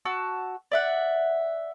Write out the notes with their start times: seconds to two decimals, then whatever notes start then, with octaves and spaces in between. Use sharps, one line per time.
0.05 F#4 A5 E6
0.72 D5 E5 F#5